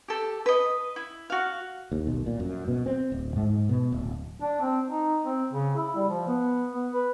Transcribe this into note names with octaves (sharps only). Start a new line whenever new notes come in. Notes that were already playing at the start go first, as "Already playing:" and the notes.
G4 A4
B4 D#5
E4
F#4 F5
D#2
B1
A#2
F#2
B2
C4
D1
G#2
B2
D1
D4
C4
D#4
C4
C#3
E4
G3
F3
B3
B3
B4